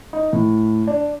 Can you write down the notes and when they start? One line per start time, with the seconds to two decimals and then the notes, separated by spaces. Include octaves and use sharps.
0.13 D#4
0.33 A2
0.87 D4